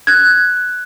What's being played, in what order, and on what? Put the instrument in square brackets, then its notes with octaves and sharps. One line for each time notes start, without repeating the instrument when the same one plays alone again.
[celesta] F#6 G#6